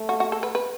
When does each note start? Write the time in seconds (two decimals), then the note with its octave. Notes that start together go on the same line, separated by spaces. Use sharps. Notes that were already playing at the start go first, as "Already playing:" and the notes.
Already playing: A3
0.09 F#4
0.20 F#4
0.32 A4
0.43 B4
0.55 B4